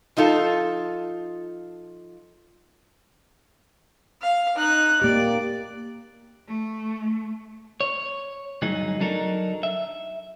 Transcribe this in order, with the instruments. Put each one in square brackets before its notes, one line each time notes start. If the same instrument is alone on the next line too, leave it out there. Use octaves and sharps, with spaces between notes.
[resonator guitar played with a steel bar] F3 D#4 F4 A4
[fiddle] F5
D#4 F#6
[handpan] A#3 G4 [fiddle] D5
[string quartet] A3
[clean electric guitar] C#5
D2 G2 F#3 D#4 G#4
F#3 D4 D#4 A4 A#4
E5